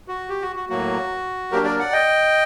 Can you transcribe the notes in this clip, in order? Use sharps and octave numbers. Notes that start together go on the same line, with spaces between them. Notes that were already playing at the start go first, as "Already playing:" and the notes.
F#4
G4
F#4
F#4
A2 F#3 A#3 F#4
F#3 A#3 D4 G4 A#4
A#4 D5
D5 F#5
D#5 G5